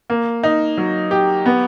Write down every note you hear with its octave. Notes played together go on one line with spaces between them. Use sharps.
A#3
D#4
F#3
G4
B3